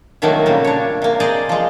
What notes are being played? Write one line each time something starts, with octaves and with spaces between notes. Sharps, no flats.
C3 D#3 F3 F#3 A3 A#3
A#2 C#3 G3
D4 C#5
C3 A#3
G#4 C5 D5 D#5 A#5
F3 G#3